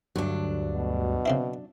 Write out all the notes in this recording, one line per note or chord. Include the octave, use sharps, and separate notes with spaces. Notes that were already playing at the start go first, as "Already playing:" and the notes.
D2 G2 F#3 D4
B2
C#3 C4 E4